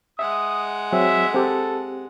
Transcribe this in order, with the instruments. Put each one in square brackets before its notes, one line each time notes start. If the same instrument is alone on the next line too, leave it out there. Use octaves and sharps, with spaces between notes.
[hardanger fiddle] G#3 F#5 [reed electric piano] E5 [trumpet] D#6
[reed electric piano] F#3 C4 G#4 [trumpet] E5
[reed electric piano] C4 G4 [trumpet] A4